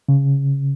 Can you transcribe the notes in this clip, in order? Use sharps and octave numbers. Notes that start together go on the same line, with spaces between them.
C#3